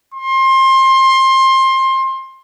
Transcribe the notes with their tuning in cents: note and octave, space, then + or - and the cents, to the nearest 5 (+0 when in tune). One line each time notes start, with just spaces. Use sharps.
C6 +25